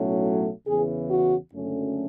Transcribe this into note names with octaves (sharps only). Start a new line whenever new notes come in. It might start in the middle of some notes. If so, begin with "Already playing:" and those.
Already playing: B1 A2 F#3 A3 C#4
E2 C#3 E3 G#4
F#4
F#1 F#2 D3 A3 C#4